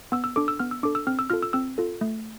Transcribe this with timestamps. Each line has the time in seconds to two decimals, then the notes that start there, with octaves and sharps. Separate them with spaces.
0.12 B3 E6
0.24 E6
0.36 D4 A4 D6
0.48 E6
0.59 B3 F6
0.71 E6
0.83 D4 A4 D6
0.95 E6
1.07 C4 F6
1.19 E6
1.30 F4 A4 F6
1.43 E6
1.53 C4 E6
1.78 F4 A4
2.01 A3